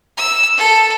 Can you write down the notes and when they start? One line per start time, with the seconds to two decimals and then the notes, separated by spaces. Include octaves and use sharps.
0.17 E6
0.57 A4